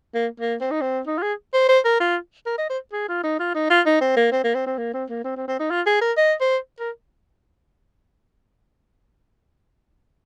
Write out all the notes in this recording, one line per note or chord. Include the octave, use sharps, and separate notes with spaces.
A#3
A#3
C4
D#4
C4
D#4
F4
G#4
C5
C5
A#4
F4
A#4
D#5
C5
G#4
F4
D#4
F4
D#4
F4
D#4
C4
A#3
C4
A#3
C4
C4
A#3
C4
A#3
C4
C4
C4
D#4
F4
G#4
A#4
D#5
C5
A#4